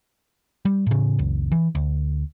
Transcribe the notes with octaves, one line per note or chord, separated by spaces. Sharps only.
G3
A2 C#3
F#1 C#2
E3
D2